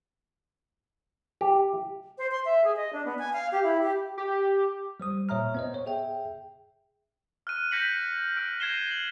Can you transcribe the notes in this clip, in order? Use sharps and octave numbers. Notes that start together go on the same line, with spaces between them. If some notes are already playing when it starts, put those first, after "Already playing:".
G4
C5
C6
E5
G#4
D#5
D4
B3
G#5
F5
G4
E4
G4
G4
G3 C5 D#6
A#2 C#5 E5 A#5 F6
B3 C5 D#5
C#5
G#4 E5 G5
F6 F#6 D#7
G6 A#6 B6 C#7 F#7
F6 D7
G#6 A#6 C7 D#7 E7 G7
C7 F#7